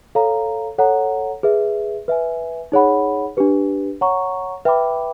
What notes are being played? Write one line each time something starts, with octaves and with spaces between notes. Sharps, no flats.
A4 C#5 F5 A#5
A4 C#5 F#5 A#5
G#4 B4 E5
B4 E5 G#5
D#4 G#4 C#5 F#5 B5
D4 G4 B4
C#5 F#5 A#5 C#6
B4 E5 G5 B5 D6